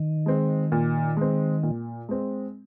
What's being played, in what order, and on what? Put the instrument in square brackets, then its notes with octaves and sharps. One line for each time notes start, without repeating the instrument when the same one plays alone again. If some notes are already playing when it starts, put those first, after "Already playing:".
Already playing: [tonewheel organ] D#3
[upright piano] G#3 C4
A#2
G#3 C4
A#2
G#3 C4